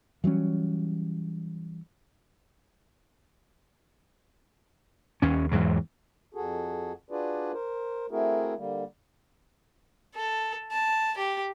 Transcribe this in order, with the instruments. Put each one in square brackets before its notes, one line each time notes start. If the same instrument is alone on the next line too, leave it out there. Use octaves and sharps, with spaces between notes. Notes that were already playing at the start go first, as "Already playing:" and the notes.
[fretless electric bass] E3 F#3 G3 C#4
[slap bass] D#2 C#4
E2 G#2 E3 F#3
[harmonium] F2 F#4 G#4 A4
D4 F4 F#4 G#4 B4 D5
A#4 C5
A3 C4 E4 F#4 G#4 A#4
D3 G3 A#3
[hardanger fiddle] A4
A5
G4